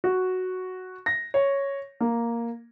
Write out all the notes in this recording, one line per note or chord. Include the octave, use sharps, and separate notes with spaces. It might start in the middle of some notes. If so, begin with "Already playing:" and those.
F#4
A#6
C#5
A#3